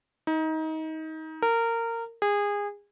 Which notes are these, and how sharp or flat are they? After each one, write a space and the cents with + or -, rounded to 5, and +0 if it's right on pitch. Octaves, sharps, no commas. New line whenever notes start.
D#4 +25
A#4 -20
G#4 -25